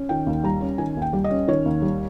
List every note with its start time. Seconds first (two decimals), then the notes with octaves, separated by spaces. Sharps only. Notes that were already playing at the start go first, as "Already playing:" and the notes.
Already playing: C#4
0.09 D#3 G5
0.27 D#2
0.44 G3 A#5
0.61 C#4
0.78 D#3 G#5
0.97 D#2
1.02 G5
1.13 G3
1.24 D#5
1.30 C#4
1.48 D#3 C#5
1.66 D#2
1.82 G3